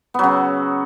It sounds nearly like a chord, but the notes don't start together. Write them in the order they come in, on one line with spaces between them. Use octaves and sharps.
B3 F#3 C#3